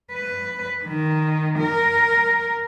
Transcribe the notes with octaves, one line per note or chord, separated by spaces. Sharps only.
B4
D#3
A#4